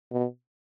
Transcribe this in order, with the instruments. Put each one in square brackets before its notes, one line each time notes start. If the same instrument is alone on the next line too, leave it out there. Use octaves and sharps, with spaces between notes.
[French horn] B2